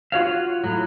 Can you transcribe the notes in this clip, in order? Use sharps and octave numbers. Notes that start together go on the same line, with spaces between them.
F4 F#4 C#5 F5
A2 F#3